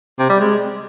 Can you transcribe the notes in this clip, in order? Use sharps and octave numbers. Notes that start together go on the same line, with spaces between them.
C3
G3
G#3